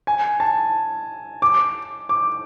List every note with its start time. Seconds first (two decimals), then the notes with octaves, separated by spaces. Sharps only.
0.07 G#5
0.40 A5
1.42 D6
2.09 D6